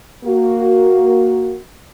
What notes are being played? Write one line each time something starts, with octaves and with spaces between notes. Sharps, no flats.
A#3 F#4